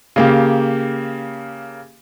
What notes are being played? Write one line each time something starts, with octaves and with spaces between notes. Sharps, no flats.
C#3 A#3 G4